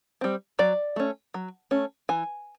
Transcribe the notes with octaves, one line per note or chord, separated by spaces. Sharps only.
G3 C4
F#3 D5
A3 C#4
F#3
A3 C#4
E3 G#5